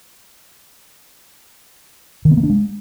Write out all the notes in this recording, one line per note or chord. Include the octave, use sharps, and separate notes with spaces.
D#3
B3
A#3
D4
G#3